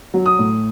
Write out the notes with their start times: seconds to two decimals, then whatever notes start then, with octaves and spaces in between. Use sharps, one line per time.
0.14 F#3
0.26 D#6
0.39 A2